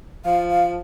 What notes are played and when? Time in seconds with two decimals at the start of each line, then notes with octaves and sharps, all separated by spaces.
0.25 F3 F5
0.51 F5